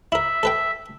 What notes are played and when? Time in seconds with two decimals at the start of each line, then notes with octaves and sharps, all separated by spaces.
0.12 E4 A#4 E5
0.43 A4 B4 G5